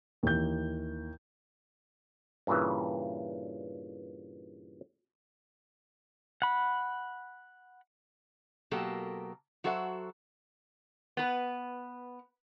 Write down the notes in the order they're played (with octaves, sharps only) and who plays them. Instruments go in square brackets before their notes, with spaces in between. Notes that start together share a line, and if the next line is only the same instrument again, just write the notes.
[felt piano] D#2 E3 G6
[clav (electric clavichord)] G2 A#2 C#3 E3
[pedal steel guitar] F#5 B5
[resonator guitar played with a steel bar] B2 F#3 A#3 G4 A4 A#4
F#3 F#4 A4 C5 E5 F#5
B3 B4